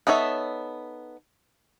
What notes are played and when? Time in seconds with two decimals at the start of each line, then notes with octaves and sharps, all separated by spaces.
0.07 B3 D#4 A4 C#5 E5